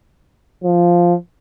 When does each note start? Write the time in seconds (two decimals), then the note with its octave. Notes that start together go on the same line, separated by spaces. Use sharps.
0.64 F3